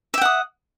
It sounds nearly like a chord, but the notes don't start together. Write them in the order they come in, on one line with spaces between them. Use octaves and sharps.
E5 G5 F#5 D#6